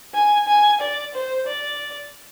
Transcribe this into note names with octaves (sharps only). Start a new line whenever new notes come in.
G#5
G#5
D5
C5
D5